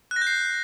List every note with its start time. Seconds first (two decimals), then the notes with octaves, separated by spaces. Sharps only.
0.11 F#6
0.16 A#6
0.22 G6
0.27 C7